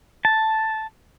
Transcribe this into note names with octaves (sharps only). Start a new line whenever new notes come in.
A5